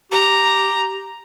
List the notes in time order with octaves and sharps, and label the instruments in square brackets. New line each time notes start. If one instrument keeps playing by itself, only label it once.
[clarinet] G4 [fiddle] A#5